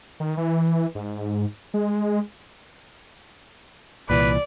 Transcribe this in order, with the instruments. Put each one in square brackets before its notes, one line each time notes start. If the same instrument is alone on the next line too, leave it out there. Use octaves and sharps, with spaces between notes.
[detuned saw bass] D#3
E3
G#2
G#3
[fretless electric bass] C2 A#2 E3 [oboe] B4 [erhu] D5